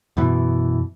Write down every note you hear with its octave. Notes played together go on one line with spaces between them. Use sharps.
F#2 B2 E3